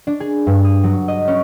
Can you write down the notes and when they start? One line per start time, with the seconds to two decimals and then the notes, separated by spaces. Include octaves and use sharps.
0.07 D4
0.20 G#4
0.47 G2
0.64 D#6
0.83 F#3
1.08 D#5
1.28 C#4